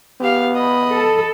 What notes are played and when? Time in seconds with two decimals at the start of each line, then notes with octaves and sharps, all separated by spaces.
0.21 B3 G4 F5
0.55 D#5 B5
0.93 A4